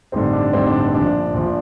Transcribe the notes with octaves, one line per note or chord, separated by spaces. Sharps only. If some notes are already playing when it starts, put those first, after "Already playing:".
A1 G2 D3 C4 D#4
D4
A1 G2 D3 C4 D#4
D4
D4
C4
A#1 A#2 F3 D4
A#1 A#2 F3